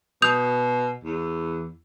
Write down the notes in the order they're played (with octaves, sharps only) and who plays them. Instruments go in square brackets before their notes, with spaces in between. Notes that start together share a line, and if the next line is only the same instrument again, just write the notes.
[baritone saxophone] B2 [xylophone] D#6 G6 F7
[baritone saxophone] E2